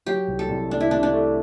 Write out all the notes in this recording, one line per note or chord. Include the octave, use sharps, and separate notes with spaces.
F#3 G4
C2
A4
C2
A3 D4
E4
C3 D4
D4
A3